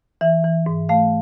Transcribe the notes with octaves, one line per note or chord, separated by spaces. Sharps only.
E3 E5
E3
G#2
A3 F5